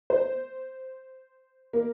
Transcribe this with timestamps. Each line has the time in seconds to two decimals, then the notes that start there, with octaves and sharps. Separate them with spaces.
0.10 C5
1.73 A#3